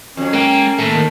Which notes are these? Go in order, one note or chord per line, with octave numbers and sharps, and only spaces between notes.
F2 F#3 C#4
G#3 A#3 G5
D#2 A2 A3
D#3